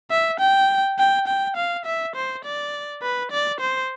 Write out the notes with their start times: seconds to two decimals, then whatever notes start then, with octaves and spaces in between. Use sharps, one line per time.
0.11 E5
0.40 G5
0.99 G5
1.27 G5
1.56 F5
1.85 E5
2.16 C5
2.44 D5
3.02 B4
3.31 D5
3.60 C5